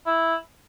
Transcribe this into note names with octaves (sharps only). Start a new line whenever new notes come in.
E4